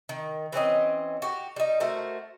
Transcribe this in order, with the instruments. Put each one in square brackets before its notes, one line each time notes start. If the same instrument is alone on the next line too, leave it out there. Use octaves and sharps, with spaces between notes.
[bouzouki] D#3
E3 C4 C#4 D#5
F#4 G4
G3 D#4
A3 F#4 A#4 C5